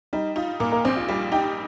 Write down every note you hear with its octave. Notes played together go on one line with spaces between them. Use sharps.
G3 D#4
D#4 F4
A#2 A#3 A#4
A#3 A#4
A#1 C4 C5
F4 F5
G3 F4 F5
D#4 G4 G5